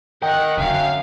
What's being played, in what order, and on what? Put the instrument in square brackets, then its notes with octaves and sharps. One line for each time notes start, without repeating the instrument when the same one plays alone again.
[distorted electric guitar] A#4 D#5 [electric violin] F#5 F#6 [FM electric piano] G5
[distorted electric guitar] F#2 [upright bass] D3 F#3 [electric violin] F5